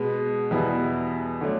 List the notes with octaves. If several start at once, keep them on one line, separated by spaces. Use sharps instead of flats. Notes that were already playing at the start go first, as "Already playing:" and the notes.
Already playing: B2 G#3 B3
E2 B2 G3 B3 E4
D3 F#3 A3